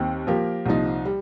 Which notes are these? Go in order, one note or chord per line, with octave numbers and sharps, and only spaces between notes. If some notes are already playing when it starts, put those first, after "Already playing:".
Already playing: D#2 D#3 C4
F3 A#3 G4 A#4
C2 A#2 F3 D#4
G3